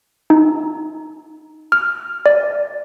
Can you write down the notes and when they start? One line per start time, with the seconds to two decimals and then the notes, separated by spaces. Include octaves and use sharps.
0.30 D#4
1.72 F6
2.26 D5